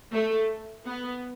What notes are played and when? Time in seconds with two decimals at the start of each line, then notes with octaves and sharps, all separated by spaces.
0.12 A3
0.86 B3